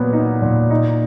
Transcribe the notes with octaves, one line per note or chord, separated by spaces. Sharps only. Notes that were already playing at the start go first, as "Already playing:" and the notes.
Already playing: A#2 F#3 B3
D#4
A#2
D#4